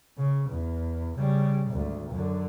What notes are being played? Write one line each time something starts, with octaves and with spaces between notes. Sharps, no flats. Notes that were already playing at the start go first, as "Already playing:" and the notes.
C#3
E2
C#3 G3
G#1 D2
F#2 D3